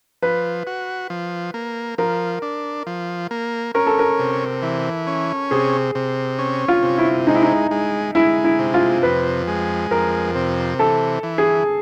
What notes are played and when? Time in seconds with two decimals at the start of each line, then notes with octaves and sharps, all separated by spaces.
0.22 F3 B4
0.67 F#4
1.10 F3
1.54 A#3
1.98 F3 A#4
2.42 D4
2.87 F3
3.31 A#3
3.75 C#4 A#4
3.87 A4
3.99 A#4
4.19 C3
4.62 E3
5.07 C#4
5.51 C3 G#4
5.95 C3
6.39 C#4
6.68 F4
6.83 C3
6.98 E4
7.27 G#3 D#4
7.35 E4
7.43 D#4
7.71 G#3
8.15 G#3 E4
8.44 E4
8.59 C3
8.74 F4
9.03 F2 B4
9.47 G#3
9.91 F2 A#4
10.35 C3
10.79 E3 A4
11.23 E3
11.38 G#4